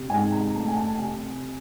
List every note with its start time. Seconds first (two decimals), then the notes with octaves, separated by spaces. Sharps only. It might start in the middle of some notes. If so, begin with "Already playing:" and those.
Already playing: C3
0.10 G#2 G#5
0.32 A#5
0.54 A3 A5
0.68 G#5
0.76 A5
0.99 C3 G#5